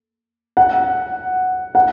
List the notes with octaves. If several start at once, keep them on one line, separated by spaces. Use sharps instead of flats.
F#5
F#5